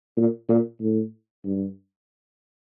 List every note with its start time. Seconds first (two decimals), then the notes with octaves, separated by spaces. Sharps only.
0.16 A#2
0.49 A#2
0.81 A2
1.45 G2